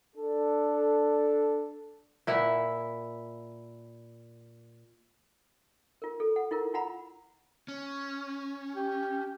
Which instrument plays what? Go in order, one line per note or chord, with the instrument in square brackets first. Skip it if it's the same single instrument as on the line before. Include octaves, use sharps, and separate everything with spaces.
[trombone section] D4 A4
[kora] A#2 E4 E5 F#5
[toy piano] F4 A#4
A4
F#5
E4 F4 A#4
F4 F#5 A#5 B5
[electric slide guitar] C#4
[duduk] G4